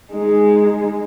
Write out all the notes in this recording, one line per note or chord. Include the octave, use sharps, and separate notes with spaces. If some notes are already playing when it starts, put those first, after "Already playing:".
G#3 D#4